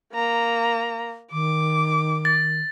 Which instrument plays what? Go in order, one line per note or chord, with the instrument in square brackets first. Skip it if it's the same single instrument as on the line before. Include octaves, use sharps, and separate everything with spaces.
[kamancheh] A#3 A#5
[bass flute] D#3 [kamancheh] D6
[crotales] A6